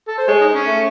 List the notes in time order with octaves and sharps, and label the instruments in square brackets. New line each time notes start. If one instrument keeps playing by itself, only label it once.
[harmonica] A4
C5
[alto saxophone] G#3 [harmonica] C#5
[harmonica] D#4
C#4
[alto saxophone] A3